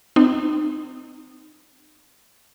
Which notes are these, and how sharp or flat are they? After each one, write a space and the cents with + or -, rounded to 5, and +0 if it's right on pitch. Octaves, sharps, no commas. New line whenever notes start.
C4 -30 D#4 -25